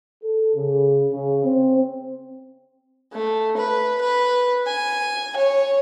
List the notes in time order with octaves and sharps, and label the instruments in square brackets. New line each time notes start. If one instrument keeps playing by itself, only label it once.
[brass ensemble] A4
C#3
C#3
C4
[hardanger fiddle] A3
B4
B4
G#5
C#5